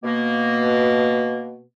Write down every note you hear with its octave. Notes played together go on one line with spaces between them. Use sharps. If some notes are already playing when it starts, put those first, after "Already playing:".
B2 A#3